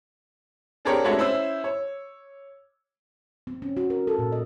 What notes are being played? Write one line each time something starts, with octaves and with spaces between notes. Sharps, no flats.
C4 D4 G4 G#4 A#4 C#5
G#3 A3 D4 F#4 C#5 E5
C#4 E4 C5 E6
C#5
C4
C#4
F#4
A#4
A4
A#2
D#5